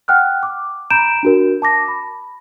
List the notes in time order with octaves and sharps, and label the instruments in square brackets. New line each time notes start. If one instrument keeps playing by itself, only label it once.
[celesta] F#5 G5 F6 F#6
D6
A#5 B5 G6 D7 E7
D4 F#4 A#4
A5 D6 A#6
B5